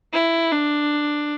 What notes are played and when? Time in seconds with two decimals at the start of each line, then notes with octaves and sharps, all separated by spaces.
0.13 E4
0.52 D4